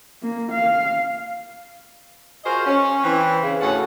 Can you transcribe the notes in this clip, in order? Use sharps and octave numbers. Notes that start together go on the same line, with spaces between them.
A#3
F5
F4 F#4 G#4 A#4 C5 D#5
C#4
E3 C4
C#3
D2 A2 C#4 A4 F#5